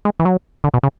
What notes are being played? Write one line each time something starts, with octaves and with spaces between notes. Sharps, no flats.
G#3
E3
F#3
D3
B2
C#3